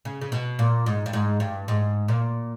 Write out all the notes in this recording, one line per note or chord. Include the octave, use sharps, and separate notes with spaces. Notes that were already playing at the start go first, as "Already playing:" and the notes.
C#3
C#3
B2
A#2
G#2
G2
G#2
G2
G#2
A#2